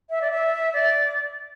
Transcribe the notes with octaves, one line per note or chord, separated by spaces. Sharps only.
E5
D5
E5
D5